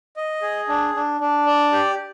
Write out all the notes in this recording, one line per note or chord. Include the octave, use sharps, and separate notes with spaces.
D#5
G#4
D4
D4
D4
D5
G4